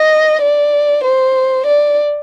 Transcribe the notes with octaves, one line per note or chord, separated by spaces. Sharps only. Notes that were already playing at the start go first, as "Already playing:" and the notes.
Already playing: D#5
D5
C5
D5